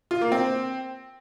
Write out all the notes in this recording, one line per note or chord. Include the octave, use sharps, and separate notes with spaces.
F4
A#3
C4